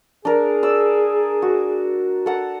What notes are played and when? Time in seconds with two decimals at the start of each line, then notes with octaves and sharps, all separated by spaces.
0.25 D4 G#4 A#4
0.63 D5 E6
1.42 F#4
2.26 A4 F#5 A#5